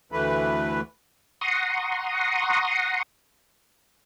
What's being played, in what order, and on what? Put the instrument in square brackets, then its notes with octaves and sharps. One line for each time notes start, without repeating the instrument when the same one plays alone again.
[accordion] D2 E3 A3 B4
[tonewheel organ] F#5 A#5 C6 C#6 D#6